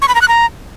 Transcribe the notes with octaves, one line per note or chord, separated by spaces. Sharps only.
C#6
B5
A#5
F#6
A#5